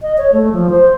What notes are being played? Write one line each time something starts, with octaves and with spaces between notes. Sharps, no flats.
D#5
C#5
A3
F3
C5